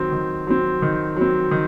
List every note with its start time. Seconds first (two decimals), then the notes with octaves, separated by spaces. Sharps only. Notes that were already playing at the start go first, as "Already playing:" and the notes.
Already playing: D#3 F#3 C4
0.12 D#3
0.47 F#3 C4
0.82 D#3
1.16 F#3 C4
1.51 D#3